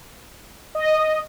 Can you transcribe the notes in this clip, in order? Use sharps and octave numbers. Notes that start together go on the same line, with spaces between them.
D#5